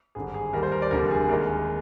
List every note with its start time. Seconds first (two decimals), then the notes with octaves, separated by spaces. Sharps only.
0.15 G#1 G2 D3 G#4
0.34 G#4
0.53 D#2 D#3 G3 A#4
0.63 C5
0.72 A#4
0.82 D5
0.91 F1 D#2 D3 G3 A#4
1.11 G#4
1.29 D#2 D#3 G#3 A#4